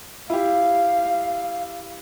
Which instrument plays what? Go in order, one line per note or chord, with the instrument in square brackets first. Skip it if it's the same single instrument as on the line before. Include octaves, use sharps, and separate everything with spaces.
[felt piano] E4 G4 [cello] F5